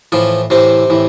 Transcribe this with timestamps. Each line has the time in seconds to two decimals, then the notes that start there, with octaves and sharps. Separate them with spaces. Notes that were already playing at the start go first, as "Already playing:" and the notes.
0.12 A2 E3 F3 F4
0.50 A2 C3 E3 C4
0.90 A2 E3